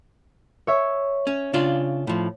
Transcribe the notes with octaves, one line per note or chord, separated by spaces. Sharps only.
C#5 E5
C#4
C#3 D4 F4
A2 F3